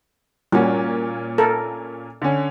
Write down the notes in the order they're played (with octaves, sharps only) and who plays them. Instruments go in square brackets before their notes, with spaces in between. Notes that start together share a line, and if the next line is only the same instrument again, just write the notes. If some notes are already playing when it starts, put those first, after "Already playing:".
[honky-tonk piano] A#2 A#3 C#4 [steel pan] G3 F#4
[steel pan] A4 A#4
[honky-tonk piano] D3 C#4